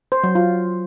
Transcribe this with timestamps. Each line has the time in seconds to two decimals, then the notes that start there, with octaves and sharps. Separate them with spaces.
0.12 C5
0.24 F#3
0.35 F4